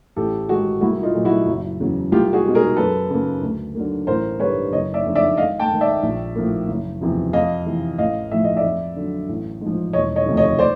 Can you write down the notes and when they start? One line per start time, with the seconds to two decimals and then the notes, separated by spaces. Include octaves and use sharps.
0.16 A1 G4 A4
0.49 G#2 D#3 G#3 F#4 G#4
0.81 C2 E4 F#4
1.03 D#4 F4
1.14 A#2 F#3 A3
1.25 E4 F#4
1.46 F#1
1.79 E2 C#3 F#3
2.12 C2 F4 G4
2.33 F#4 G#4
2.44 B2 G#3
2.55 G#4 A#4
2.76 F#2 A4 B4
3.10 C#3 F#3 A#3
3.42 D2
3.75 D3 F#3 A#3
4.07 A1 A#4 C5
4.39 G2 D3 G3 B4 C#5
4.72 F#1 C#5 D#5
4.94 D5 E5
5.06 F2 D3
5.15 D5 E5
5.37 G#1 D#5 F5
5.60 G5 A5
5.70 G#2 D#3
5.81 D5 E5
6.03 A#1
6.36 A2 F3 A#3
6.68 F#1
7.01 E2 C3 F3
7.33 F2 D#5 F5
7.66 C3 E3
7.98 A1 D#5 F5
8.31 A2 F3 A3 E5
8.44 D#5
8.57 D5 E5
8.64 F2
8.96 D3 F#3
9.29 A1
9.61 G#2
9.66 F3
9.93 E1 C#5 D#5
10.16 C#5 D#5
10.26 D2 C3 F3
10.37 C#5 D#5
10.59 C5 D5